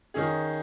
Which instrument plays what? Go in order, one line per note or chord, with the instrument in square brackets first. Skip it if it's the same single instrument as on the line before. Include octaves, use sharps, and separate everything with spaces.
[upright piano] D#3 C#4 G#4